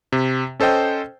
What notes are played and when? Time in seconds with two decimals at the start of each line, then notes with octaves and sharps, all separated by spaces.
0.12 C3
0.60 C#4 A4 C5 D#5 G5